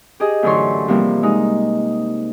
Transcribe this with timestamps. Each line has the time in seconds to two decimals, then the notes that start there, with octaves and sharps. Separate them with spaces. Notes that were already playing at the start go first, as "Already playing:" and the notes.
0.20 G4 G#4 D#5
0.43 F#2 A2 D3 E3 C#5 C6
0.88 C3 E3 F3 G3 A#3
1.23 G#3 D#4